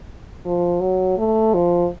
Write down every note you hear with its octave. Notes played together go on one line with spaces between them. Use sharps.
F3
F#3
A3
F3